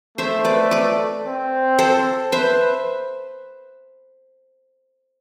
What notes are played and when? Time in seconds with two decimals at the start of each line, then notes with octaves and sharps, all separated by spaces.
0.18 A3 C5 E5
0.45 B4 D5
0.71 B4 D5
1.26 C4
1.79 A4 C5
2.32 B4 C5 E5